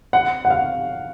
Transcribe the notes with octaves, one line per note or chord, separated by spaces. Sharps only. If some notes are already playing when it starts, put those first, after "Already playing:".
F#5
F#5
F5